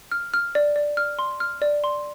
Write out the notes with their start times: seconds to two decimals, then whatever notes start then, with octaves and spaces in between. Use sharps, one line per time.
0.12 F6
0.34 F6
0.55 D5
0.76 D5
0.97 F6
1.19 C6
1.40 F6
1.62 D5
1.84 C6